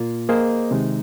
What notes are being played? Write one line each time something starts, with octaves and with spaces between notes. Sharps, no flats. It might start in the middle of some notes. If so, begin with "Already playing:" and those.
Already playing: A#2 A#3 F4
A#3 G#4 C5 D#5
C3 D#3 G#3 D#4